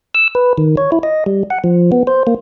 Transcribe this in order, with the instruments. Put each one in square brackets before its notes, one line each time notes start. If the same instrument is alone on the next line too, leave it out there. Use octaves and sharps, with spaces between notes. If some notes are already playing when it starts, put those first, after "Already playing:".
[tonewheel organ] E6
B4
D#3
C#5
E4
D#5
G3
F#5
F3
B3
C5
A#3